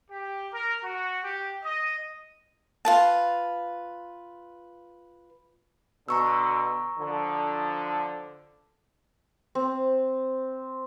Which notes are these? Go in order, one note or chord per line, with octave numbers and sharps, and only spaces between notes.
G4
A#4
F#4
G4
D#5
F4 B4 A5
B2 D3 A#5 C#6 E6
D3 F3
C4